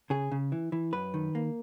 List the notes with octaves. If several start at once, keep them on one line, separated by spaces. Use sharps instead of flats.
C#3 G#4
C#3
E3
E3
F#2 B4
D#3
A#3